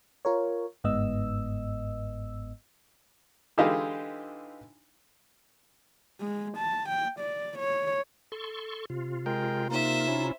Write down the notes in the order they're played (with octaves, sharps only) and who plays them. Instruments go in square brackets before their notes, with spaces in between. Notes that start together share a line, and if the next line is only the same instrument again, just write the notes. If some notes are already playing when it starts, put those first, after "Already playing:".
[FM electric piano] F4 A#4 C#5
G1 G#2 B3 D#5 E6
[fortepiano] D3 E3 G#3 D#4 F4 G4
[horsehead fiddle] G#3
A5
G5
D5
C#5
[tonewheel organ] A4 C6 C#6
C3 F4
[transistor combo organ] G#3 A#4 G5
[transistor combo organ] A#3 [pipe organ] D#4 [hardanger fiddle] C5 E5
[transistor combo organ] C#4 E4